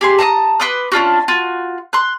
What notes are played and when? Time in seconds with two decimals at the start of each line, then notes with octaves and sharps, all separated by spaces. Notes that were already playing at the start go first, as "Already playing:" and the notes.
0.01 G4 G#4 C6
0.19 A5 A#5 C6 D#6
0.60 B4 C6 D6 D#6
0.92 C#4 D4 F4 F#4
1.28 F4 F#4
1.93 C6 F#6